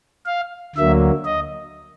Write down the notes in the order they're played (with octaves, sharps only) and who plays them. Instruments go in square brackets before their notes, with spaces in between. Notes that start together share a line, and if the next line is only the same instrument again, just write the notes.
[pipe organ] F5
D2 D3 F#3 A#3 E5
D#5